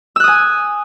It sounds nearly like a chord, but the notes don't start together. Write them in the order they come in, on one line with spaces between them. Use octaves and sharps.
E6 F#6 D#6 G#5